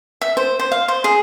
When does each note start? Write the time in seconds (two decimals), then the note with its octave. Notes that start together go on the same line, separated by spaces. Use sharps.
0.21 E5
0.37 C5
0.59 C5
0.72 F5
0.88 C5
1.04 G#4